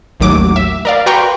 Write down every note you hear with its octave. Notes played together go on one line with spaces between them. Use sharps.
A1 D#2 F#3 D6
E5
A#4 D5 F5
F#4 B4 G5 A#5 C6 C#6